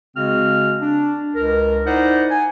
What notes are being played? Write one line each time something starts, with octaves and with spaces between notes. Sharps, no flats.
C#3 G#3 C4 F#4 F6
D4
C#2 A#4
D#4 E4 C5 D5 F#5
G#5